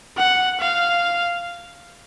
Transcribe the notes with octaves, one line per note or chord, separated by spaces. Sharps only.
F#5
F5